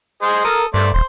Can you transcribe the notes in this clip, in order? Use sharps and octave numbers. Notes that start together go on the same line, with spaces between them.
G#4 C5 D#5
A4 A#4 D#6
G2 A3 C5 D5
D#1 C5